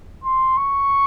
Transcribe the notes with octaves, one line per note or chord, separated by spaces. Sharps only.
C6
C#6